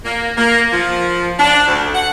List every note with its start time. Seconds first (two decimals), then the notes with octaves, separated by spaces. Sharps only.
0.05 A#3
0.37 A#3
0.72 F3
1.39 D4
1.67 D2
1.95 F#5